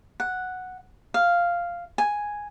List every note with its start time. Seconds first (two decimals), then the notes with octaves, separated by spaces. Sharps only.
0.20 F#5
1.14 F5
1.98 G#5